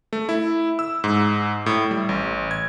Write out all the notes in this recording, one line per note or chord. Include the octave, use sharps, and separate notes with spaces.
A3
E4
E6
G#2
A2
G3
A1
G#6